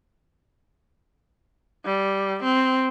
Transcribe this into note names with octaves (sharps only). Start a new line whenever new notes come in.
G3
C4